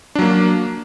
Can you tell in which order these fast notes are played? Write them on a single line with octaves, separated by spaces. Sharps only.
D4 F#3 A#3